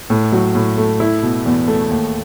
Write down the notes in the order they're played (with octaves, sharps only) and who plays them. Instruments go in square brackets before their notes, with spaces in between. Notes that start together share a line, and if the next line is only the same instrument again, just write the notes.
[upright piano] A2
F#3
A2
A3
E4
B2
E2
A3
D#2